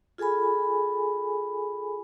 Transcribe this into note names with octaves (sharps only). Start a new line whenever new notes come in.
F4 G#4 A4 G#5 B5